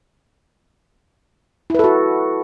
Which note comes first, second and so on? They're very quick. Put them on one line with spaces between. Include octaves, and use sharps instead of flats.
E4 B4 A4 F#4